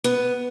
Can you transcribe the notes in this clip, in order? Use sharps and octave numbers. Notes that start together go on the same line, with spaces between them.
B3